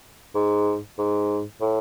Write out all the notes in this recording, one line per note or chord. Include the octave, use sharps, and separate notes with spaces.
G#2
G#2
A2